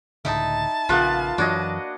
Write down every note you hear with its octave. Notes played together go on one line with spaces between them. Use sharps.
C#2 A2 D3 D#4 E4 A5
A#1 C#3 A#3 B3 F4 B4
F#2 E3 F#3 D4 F#4 C#5 D#5